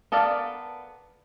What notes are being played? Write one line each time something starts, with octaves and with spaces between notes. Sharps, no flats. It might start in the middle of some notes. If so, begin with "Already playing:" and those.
B3 A4 A#4 D5 F5